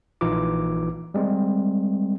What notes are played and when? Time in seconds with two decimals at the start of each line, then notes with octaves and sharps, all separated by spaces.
0.21 A#1 E3 D#4 F4 D6
1.14 G3 G#3 C4